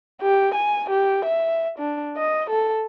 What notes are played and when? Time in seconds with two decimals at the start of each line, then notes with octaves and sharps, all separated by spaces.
0.22 G4
0.54 G#5
0.90 G4
1.25 E5
1.79 D4
2.17 D#5
2.50 A4